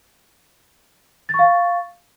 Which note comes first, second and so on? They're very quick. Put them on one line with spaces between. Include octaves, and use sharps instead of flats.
A6 C#6 F5